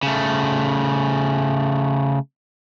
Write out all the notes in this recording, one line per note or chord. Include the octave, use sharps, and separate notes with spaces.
C#3 A3